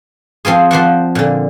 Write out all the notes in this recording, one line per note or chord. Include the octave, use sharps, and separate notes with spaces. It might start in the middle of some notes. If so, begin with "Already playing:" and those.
F3 C4 F4 G#4
F3 C5 D5 F#5
A#2 D3